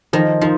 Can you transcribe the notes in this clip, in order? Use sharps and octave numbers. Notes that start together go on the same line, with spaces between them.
D#3 F3
F3 D#4